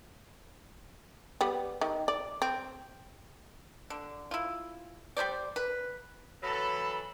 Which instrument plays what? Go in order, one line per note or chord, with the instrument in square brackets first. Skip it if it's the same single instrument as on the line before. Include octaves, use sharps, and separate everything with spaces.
[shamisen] G3 B3
D#3
D5
C4
[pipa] D3
E4 F4
G3 G#3 C5 D5
B4
[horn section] E3 F#3 A4 [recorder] B5